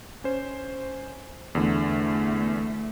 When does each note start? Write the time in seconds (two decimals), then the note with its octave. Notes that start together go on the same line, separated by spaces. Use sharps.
0.24 C#4 C5
1.55 E2 D3 A3